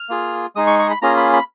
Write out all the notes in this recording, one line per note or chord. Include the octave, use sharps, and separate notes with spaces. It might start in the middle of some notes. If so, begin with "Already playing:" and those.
Already playing: F6
A#3 F4 G#4
G#3 D#4 G#4 D#6
C#6
C#6
B5
A#3 C#4 F4 G#4 A#5
B5
B5